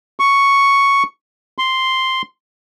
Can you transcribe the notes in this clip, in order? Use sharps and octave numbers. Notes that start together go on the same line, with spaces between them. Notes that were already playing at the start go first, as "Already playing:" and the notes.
C#6
C6